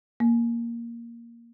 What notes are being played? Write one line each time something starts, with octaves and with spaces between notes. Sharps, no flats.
A#3